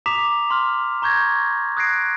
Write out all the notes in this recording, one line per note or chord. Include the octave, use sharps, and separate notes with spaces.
A#5 D6 D#6 B6 E7 F7
C6 F6
A#5 C#6 G6 G#6 A#6
D#6 F#6 G#6 A#6 C7 D7